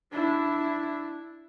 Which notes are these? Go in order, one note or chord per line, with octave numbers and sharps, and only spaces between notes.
D4 E4